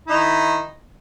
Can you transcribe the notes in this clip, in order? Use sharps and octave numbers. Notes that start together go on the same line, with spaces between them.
D#3 D#4 E4